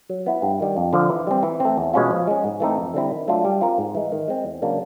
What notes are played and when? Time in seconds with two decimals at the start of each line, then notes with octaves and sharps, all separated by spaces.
0.09 F#3
0.26 B3 E4
0.42 G2
0.60 D#3 G3
0.77 F2
0.93 D3 F3
1.09 E3
1.27 G3 C4
1.43 E3
1.60 A3 C4
1.78 E2
1.94 B2 G#3 C#4 F4
2.11 F3
2.27 G#3 C#4
2.44 G#2
2.60 E3 A3 C4 D#4
2.77 F2
2.94 D3 G3 C4 E4
3.11 D#3
3.28 F#3 A3 D4 F4
3.45 G3
3.61 C4 F4 A#4
3.78 G#2
3.95 E3 G#3
4.12 D#3
4.28 G#3 C4
4.45 E2
4.62 C#3 F#3 A#3 D4